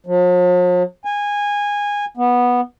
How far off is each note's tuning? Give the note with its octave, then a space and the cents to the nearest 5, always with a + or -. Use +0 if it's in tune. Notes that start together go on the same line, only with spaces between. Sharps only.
F3 +45
G#5 -20
B3 -10